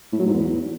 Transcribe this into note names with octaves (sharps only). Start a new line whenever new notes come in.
A2
F#3
G#2
E2